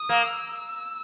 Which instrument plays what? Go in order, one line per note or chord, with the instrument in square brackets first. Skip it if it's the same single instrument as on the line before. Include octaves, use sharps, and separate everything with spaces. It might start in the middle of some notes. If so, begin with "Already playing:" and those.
Already playing: [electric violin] D#6
[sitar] A#3
[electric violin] E6